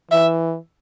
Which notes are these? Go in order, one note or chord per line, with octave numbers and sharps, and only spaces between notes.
E3 E5